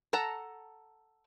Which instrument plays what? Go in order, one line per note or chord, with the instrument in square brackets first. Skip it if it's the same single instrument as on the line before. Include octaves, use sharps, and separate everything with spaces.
[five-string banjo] A4 F#5 A5 A#5